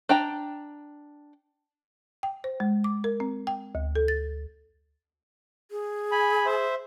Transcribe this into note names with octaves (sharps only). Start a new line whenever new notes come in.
D4 G5 A#5
G5
C5
G#3
D6
A#4
C4
G5
D2
A4
A6
G#4
G#5 B5
C5 E5